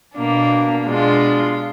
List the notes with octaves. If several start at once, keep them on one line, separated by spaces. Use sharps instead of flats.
B2 A#3 D4
B2 G#3 D4 F4